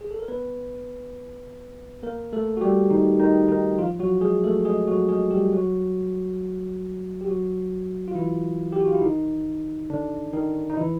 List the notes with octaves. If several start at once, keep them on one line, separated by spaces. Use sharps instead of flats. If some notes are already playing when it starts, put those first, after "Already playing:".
G#4
A4
A#4
B3 B4
A#3 A#4
A3 A4
F#4
G3 G4
D#3 D#4
D#3 D#4
D#3 D#4
F3 F4
F#3 F#4
G#3 G#4
A3 A4
G#3 G#4
F#3 F#4
G#3 G#4
G3 G4
F#3 F#4
G4
F#3 F#4
F4
E3 E4
G4
F#4
F4
E4
D#3 D#4
D3 D4
D#3 D#4
D#4
E3 E4